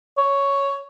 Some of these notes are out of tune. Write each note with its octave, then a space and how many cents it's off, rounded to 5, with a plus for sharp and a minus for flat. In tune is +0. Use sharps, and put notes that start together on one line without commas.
C#5 +5